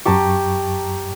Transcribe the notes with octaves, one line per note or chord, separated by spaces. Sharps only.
F#2 G4 A5 A#5 C#6